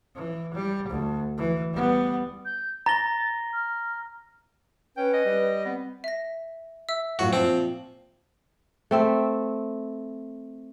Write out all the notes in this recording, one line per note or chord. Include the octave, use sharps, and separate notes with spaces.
E3
G3
D2
E3
G3 B3
G6
A#5 A6 A#6 G7
F6
C#4 B4 G5
D#5
G3
B3 C4
E5 A#6
E5 E6
F#2 A2 F4 F#4
A#2 F3 C4
A3 C4 E5